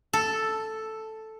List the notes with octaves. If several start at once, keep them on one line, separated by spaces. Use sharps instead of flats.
A4